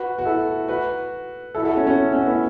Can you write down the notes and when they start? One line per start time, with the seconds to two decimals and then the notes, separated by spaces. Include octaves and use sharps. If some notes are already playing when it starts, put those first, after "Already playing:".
Already playing: F#4 B4
0.19 F#4
0.25 E4 A4
0.68 F#4 B4
1.55 E4 A4
1.62 F#4
1.65 E4 A4
1.76 C#4 F#4
1.87 C#4 F#4
2.12 C#4 F#4
2.26 B3 E4